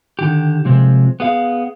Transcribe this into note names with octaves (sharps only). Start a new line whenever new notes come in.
D3 D#3 G4
C3 F3 G#3 C4
B3 G#4 F5